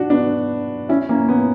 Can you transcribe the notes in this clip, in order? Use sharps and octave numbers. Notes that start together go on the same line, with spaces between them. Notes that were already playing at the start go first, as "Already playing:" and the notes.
Already playing: D4 F#4
B3 D4
C#4 E4
A#3 C#4
B3